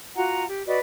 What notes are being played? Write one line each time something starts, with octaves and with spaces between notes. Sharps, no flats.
F4 F#4 F#5 A#5
G4
F#4 B4 D5 D#5